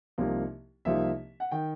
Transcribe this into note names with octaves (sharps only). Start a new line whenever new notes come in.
C2 C3 F3 A#3 D#4
C2 C3 F3 A#3 D#4 E5
F#5
D#3 G5